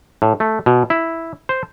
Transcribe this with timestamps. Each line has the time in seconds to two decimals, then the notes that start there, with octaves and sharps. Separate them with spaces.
0.22 A2
0.40 A3
0.66 B2
0.90 E4
1.49 C5